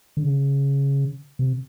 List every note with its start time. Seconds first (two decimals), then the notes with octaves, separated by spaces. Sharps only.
0.17 D3
0.23 C#3
1.39 C3